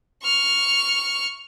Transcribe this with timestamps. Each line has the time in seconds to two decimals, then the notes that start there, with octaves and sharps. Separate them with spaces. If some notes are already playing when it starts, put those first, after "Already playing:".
0.23 C#6 F6